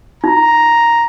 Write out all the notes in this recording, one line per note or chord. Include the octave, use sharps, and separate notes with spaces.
D#4 F4 A#5